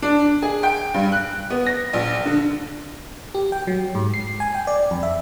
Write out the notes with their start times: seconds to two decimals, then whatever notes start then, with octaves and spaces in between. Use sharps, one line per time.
0.02 D4
0.42 G#4
0.63 G5
0.94 G2
1.12 F#6
1.50 B3
1.66 A#6
1.93 A#1
2.26 D3
3.35 G4
3.52 G5
3.67 F#3
3.95 G#2
4.14 C7
4.40 G#5
4.55 G5
4.67 D5
4.91 F2
5.03 E5